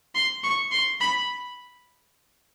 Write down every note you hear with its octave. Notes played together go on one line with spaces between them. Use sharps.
C6
C#6
C6
B5